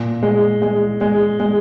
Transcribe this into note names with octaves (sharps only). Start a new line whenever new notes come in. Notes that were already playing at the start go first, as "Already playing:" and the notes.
Already playing: A#2
G#3
G#3
G#3
G#3